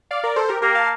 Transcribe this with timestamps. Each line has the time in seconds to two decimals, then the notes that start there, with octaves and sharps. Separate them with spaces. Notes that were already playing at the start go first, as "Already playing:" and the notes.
0.11 D5 F5
0.23 A#4 D5
0.36 A4 C5
0.49 G4 A#4
0.62 A#3 G4 A#4
0.75 F5 A5